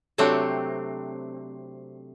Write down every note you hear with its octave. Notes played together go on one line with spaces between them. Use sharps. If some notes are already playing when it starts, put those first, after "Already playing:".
C3 F#3 A3 C4 D4